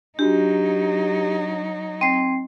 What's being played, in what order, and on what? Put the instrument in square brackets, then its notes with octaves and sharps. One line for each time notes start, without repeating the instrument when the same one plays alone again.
[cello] F#3 D#4 [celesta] D4 F#4 [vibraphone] G4
[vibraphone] C4 [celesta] G5 C7